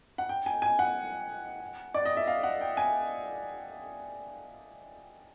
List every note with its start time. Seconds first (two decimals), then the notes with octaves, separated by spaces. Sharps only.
0.18 F#5
0.29 G5
0.46 G#5
0.62 G#5
0.79 F#5
1.94 D5
2.05 D#5
2.17 E5
2.27 F5
2.43 F#5
2.61 G5
2.77 G#5